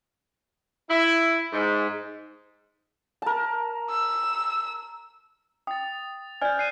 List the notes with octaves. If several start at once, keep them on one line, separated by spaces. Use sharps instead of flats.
E4
G#2
A#4 A5
E6
G5 D#6 A6
C5 D5 G#5 F6 G6
G#5 F#6 C7 D#7